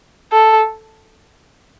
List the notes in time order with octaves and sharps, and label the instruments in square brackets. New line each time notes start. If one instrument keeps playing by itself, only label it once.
[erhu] A4